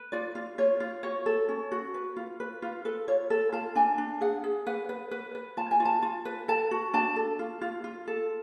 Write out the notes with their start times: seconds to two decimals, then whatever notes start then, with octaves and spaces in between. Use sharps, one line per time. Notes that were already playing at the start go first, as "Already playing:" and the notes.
Already playing: B4
0.12 F4 D5
0.35 F4
0.58 F4 C#5
0.80 F4
1.03 F#4 C#5
1.26 A4
1.49 C#4
1.72 F#4
1.94 B4
2.16 F4
2.40 B4
2.62 F4
2.85 A4 B4
3.08 F4 C#5
3.30 A4
3.52 F4 A5
3.75 D4 G#5
3.98 D4
4.21 G#4 F#5
4.44 G#4
4.66 B4 F#5
4.89 B4
5.11 B4
5.35 B4
5.57 F4 A5
5.71 G#5
5.80 F4
5.85 A5
6.02 F4
6.25 B4
6.48 A4 A5
6.71 F#4
6.94 D4 A5
7.16 A4
7.39 F4
7.61 F4
7.84 F4
8.07 A4